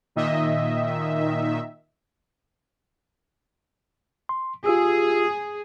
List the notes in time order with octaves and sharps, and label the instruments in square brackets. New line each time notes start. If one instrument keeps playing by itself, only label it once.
[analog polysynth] A#2 D#3 A#3 D#4 D#5 E5
[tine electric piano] C6
[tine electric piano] F4 G4 E6 [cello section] G#4